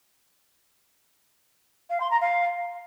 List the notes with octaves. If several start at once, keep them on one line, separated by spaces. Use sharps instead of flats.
F5
C6
A#5
F5